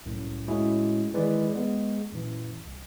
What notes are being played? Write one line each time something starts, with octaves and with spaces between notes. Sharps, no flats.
C2 F#2 A2
A2 G#3 C#4 E4 F#4 G#4
D#3 E3 G#3 B4 D5
G#3 B3
F#2 A#2 E3
C2